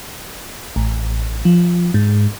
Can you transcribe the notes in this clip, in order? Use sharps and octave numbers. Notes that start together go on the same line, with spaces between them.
A1
F3
G#2